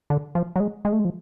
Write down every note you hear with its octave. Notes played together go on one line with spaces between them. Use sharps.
D3
F3
F#3
G#3
G#3
A3
G#3
F3